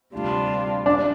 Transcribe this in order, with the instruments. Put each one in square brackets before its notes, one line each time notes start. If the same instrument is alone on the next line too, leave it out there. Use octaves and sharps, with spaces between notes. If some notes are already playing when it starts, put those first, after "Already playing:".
[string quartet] D2 C3 G3 D4 F4
[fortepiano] D4